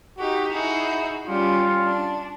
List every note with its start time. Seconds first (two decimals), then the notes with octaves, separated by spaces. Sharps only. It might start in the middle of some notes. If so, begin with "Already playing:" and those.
0.18 D#4 F#4 G4
0.51 D#4 E4 F#4 G#4
1.26 G3 C#4 F4
1.83 D4